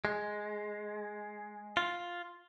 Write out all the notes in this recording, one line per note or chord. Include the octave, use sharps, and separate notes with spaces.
G#3
F4